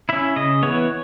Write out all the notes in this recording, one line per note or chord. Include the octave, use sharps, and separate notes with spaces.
C#4 E4 E5
C#3 D#5
E3 B3 C#5